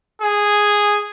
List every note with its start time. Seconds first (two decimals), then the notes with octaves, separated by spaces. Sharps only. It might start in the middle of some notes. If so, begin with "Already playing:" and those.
0.22 G#4